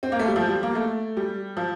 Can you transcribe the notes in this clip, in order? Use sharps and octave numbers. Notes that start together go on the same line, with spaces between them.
C4
A#3
A3
G3
F3
G3
A#3
A3
G3
F3